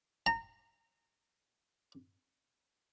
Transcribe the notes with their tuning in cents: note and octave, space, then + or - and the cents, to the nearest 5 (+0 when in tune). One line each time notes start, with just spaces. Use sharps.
A#5 -30